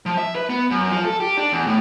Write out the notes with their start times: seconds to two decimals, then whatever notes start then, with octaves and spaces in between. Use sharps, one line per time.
0.06 F3
0.17 E5
0.35 B4
0.50 B3
0.71 F#2
0.91 F3
1.05 A4
1.20 G4
1.37 D4
1.52 E2
1.67 A2